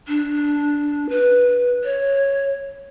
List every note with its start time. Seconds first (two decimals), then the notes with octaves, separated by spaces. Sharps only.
0.08 D4
1.10 B4
1.84 C#5